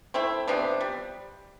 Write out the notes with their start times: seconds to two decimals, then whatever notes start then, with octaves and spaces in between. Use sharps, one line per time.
0.14 A3 C4 E4
0.47 C3 F3 B3 D4
0.81 G3